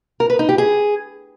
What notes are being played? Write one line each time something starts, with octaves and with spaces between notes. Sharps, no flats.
A#4
B4
D#4
G4
G#4